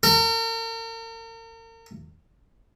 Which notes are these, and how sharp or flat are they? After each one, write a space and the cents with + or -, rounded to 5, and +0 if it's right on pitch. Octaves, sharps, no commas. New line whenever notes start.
A#4 -40